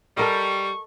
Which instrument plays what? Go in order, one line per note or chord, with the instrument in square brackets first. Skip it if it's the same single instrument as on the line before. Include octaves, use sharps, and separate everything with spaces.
[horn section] G3 [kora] A4 A#4 D#5 [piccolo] C#6